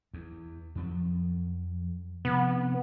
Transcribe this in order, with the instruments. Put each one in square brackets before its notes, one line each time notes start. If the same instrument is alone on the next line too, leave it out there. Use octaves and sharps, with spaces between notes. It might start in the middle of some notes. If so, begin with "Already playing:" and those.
[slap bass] E2
F2 F3 F#3
[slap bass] C3 F3 C4 [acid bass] B3